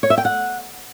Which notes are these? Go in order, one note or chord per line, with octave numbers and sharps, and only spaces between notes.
C#5
E5
G5
F#5